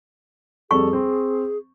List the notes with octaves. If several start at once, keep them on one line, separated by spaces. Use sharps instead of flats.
F2 G3 G#4 A4 C#6
C4